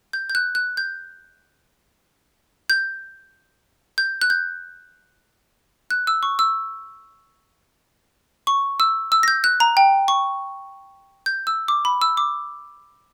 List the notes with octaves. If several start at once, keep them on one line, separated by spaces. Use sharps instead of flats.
G6
G6
F#6
F#6
G6
G6
G6
F#6
G6
F#6
E6
C#6
E6
C#6
E6
E6
A#6
G6
F#6
A#5
G5
C#6
G6
E6
D6
B5
E6
D6